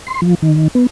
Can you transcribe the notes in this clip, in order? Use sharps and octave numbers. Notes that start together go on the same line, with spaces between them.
C6
F3
D#3
B3